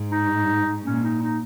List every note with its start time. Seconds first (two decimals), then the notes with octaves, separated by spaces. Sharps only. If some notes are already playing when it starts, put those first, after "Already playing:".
Already playing: G#2
0.11 D#4
0.85 A#2 C#4
1.03 D#4
1.22 D#4